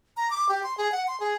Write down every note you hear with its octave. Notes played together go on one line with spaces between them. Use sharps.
A#5
D6
G4
C6
G#4
F#5
C6
G#4